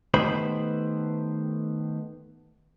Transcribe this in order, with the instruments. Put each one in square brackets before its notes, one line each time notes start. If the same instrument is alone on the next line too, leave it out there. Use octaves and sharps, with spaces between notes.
[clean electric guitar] D#3 A3 B3 G4 C5 B5